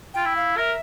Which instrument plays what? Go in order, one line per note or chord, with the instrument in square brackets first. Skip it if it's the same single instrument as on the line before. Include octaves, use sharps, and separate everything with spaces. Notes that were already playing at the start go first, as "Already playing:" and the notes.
[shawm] F4 [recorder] G5
[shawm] E4
[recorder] F5
[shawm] A#4 [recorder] E5